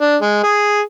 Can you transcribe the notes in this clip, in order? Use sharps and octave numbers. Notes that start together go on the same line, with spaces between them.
D4
G#3
G#4